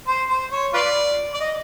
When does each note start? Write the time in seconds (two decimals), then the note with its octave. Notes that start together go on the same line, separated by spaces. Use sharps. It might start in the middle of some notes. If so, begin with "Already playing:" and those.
0.08 C5
0.30 C5
0.51 C#5
0.74 F4 B4 D5
1.34 D5
1.40 D#5